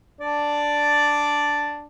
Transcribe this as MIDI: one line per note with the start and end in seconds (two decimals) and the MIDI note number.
0.21 1.85 62
0.21 1.85 74